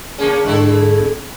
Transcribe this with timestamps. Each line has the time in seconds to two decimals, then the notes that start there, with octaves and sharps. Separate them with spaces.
0.18 C#3 A#3 C#4 G#4
0.45 G#2 D3 E4 A4
0.63 G#4
0.98 C4